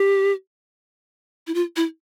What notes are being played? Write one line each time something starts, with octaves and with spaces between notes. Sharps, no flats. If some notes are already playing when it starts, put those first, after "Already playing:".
Already playing: G4
E4
F4
E4